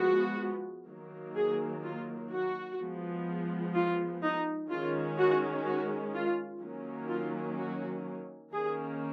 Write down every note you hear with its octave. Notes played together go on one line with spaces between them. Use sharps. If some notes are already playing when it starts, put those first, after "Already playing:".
Already playing: F3 G#3 B3 F#4
D#3 F#3 A#3
G#4
F4
F#4
F3 G#3 B3
F4
D#4
D#3 G#3 C#4 F4
F#4
F#4
F4
D#3 F#3 A#3 C#4
F4
F#4
D#3 A#3 C#4 G#4